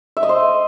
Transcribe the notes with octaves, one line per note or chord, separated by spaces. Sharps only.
E5
D#5
C5